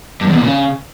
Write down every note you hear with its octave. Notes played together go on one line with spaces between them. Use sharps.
G2
E2
B2
A#2
C#3